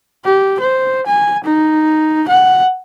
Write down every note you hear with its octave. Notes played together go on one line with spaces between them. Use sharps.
G4
C5
G#5
D#4
F#5